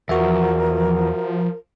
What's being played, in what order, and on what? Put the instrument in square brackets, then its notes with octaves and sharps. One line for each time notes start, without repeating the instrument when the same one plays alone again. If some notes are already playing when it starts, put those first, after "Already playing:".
[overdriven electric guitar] E2 [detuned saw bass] F3 [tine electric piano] F#4 E5 [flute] A#4